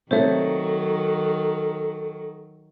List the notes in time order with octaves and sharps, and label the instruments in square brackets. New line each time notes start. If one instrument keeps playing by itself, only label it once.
[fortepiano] C3 A3 [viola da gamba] D#3 F#3 [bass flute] A4 [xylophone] C5 C#5 E5